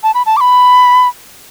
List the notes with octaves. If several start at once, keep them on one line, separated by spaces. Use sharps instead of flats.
A5
B5
A5
D6
B5